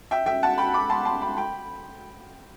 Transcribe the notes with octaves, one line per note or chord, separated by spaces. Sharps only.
E5 G5
E5 G5
F#5 A5
G5 B5
B5 D6
A5 C6
A5 C6
G5 B5
G5 B5